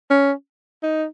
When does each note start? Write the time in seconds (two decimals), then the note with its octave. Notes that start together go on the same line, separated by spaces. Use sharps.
0.10 C#4
0.83 D#4